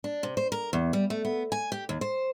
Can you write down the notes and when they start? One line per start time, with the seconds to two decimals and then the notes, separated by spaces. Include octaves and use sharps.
0.04 D4
0.23 C3
0.37 C5
0.52 A#4
0.73 E2
0.93 G3
1.10 A3
1.25 B3
1.52 G#5
1.72 G4
1.89 D#2
2.01 C5